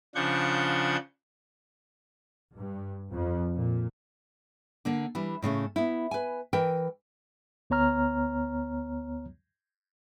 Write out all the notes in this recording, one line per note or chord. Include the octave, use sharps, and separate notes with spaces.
C#3 F3 D4 F#5 G6 G#6
G2
F2
A#2
D3 A#3 D4
E3 G3 D4
A2 C#3 A3 C#4
B3 E4
B4 G#5
E3 A#4 G5
D2 B3 C#5 A#5 F6